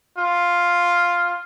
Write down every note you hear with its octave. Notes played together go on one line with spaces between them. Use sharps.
F4